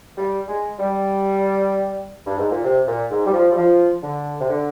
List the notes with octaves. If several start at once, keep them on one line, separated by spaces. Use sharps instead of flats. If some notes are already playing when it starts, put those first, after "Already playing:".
G3
G#3
G3
G2
G#2
A#2
C3
A#2
G#2
G3
F3
G3
F3
D3
C3
D3